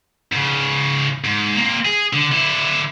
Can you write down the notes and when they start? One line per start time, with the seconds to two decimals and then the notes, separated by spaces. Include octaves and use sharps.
0.32 G#2 C#3
1.24 G#2
1.56 A#3 C4
1.85 G#4
2.13 D3
2.32 D3 E4